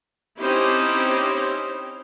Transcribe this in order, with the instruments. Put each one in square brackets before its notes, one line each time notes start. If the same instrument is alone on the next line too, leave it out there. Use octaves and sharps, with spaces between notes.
[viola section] C4 C#4 D#4 E4 G4 C5